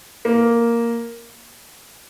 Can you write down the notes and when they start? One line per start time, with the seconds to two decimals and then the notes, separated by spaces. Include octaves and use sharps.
0.25 A#3